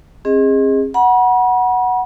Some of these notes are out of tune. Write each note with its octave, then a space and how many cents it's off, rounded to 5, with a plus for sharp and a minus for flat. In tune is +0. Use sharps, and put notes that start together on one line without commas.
C4 +40 G#4 -20 D#5 +0
F#5 +0 B5 -45